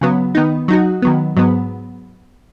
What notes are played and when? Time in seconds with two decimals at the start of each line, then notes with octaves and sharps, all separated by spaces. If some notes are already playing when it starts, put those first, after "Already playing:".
0.01 C#3 F#3 B3
0.35 D#3 B3 D#4
0.68 F#3 D#4 F#4
1.02 D#3 F#3 B3
1.37 G#2 F#3 B3